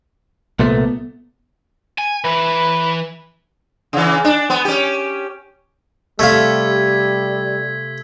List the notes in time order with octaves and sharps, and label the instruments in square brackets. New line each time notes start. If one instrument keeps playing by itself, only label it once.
[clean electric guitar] C2 A#2 A3 [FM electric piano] B3
[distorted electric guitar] G#5
[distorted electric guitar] E3 [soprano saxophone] B4
[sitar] C#3 E3
D4
B3
C#4 G4
[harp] C3 A4 [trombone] G3 [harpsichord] A3 F5 [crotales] E6 G#6 B6